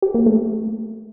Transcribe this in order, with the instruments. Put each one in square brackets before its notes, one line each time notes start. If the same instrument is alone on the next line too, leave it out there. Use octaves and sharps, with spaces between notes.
[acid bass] G4
A#3
A3